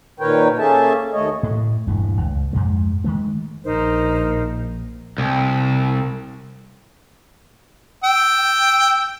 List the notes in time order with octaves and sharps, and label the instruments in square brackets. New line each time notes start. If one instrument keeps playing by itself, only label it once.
[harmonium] A#2 D#3 A#4 B4 C#5 G5
A#3 C#4 G#4 A4 E5 A5
D#2 A3 C#5 D#5
[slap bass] A2
D#1 G2 E3
C#2
F2 G#2 G#3
D#3 G#3 A3
[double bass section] A#1 [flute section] D#4 A#4 C5
[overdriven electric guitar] C2
[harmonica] G5 E6